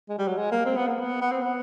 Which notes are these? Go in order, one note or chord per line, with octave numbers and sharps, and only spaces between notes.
G#3
G3
F#3
G#3
A#3
C4
B3
A#3
B3
B3
C4
B3